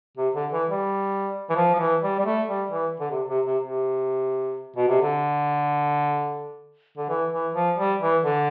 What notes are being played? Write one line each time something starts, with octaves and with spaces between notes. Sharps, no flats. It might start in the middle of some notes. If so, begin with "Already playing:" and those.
C3
D3
E3
G3
E3
F3
F3
E3
G3
G3
A3
G3
E3
D3
C3
C3
C3
C3
B2
C3
D3
D3
E3
E3
F3
G3
E3
D3